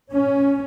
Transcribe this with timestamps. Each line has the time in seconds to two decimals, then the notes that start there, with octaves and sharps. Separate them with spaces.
0.12 C#4